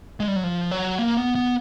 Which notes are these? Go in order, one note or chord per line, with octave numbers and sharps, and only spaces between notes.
G#3
G3
F#3
F3
F#3
A#3
B3
B3